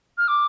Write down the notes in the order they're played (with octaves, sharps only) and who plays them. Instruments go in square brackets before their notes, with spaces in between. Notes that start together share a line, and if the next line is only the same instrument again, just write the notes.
[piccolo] F6
D6